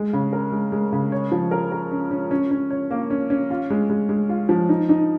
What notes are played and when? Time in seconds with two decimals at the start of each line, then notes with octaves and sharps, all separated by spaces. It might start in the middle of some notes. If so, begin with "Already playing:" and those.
Already playing: G#3
0.13 C#3
0.33 A#4
0.52 G#3
0.72 G#3
0.93 C#3
1.12 C#5
1.32 F3
1.51 A#4
1.72 A#4
1.91 C#4
2.11 C#4
2.31 C#4
2.51 C#4
2.70 C#5
2.91 A#3
3.10 C#4
3.30 C#4
3.50 F4
3.70 G#3
3.90 G#3
4.09 G#3
4.29 F4
4.49 F3
4.69 D#4
4.89 D#4